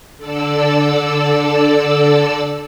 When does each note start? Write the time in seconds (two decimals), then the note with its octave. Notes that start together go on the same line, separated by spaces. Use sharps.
0.17 D3 A4 D5 E6